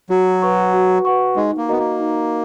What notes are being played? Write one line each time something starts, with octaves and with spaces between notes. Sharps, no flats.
F#3 F#4
B4 F#5 C#6
F#4
B4 F#5 C#6
G#3 D#4
A#3
B3 F#4 A#4 D#5 A#5
A#3
D#4